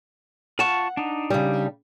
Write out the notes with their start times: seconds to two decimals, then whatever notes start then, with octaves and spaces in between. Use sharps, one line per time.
0.59 F4 F#5 A5 C#6
0.97 D4 D#4
1.30 C#3 G3